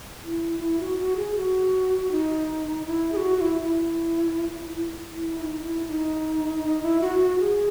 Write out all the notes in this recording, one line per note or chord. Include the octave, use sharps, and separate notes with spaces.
E4
E4
F#4
F#4
G#4
F#4
D#4
E4
G#4
F#4
F#4
E4
E4
E4
E4
D#4
E4
D#4
D#4
E4
F#4
F#4
G#4